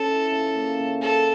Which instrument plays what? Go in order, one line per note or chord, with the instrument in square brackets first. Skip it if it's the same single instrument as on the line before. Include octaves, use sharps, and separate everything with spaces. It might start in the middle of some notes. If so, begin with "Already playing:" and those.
Already playing: [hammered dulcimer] C#4 [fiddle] A4
[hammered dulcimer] E4
C#3
A#3
C#3
[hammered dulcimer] C#3 [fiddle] A4